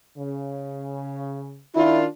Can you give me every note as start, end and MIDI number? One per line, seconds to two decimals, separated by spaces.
0.17 1.62 49
1.76 2.06 51
1.76 2.06 62
1.76 2.01 64
1.76 2.06 65